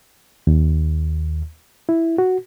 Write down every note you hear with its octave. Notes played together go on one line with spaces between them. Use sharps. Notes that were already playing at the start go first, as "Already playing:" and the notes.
D#2
E4
F#4